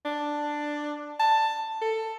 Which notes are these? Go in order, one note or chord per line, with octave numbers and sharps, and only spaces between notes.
D4
A5
A4